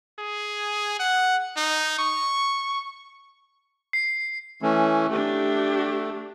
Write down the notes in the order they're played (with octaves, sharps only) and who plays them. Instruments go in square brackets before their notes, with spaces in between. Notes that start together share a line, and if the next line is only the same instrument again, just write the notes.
[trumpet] G#4
F#5
D#4
C#6
[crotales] C7
[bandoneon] E3 A3 C#4
[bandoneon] A3 [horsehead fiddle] D4 G4